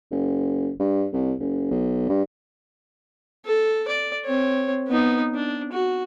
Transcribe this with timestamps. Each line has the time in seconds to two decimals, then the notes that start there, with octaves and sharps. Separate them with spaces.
0.11 F#1
0.80 G2
1.13 C2
1.39 F#1
1.71 B1
2.09 G2
3.45 A4
3.88 D5
4.26 C4 C#5
4.88 B3 D#4
5.35 D4
5.72 F#4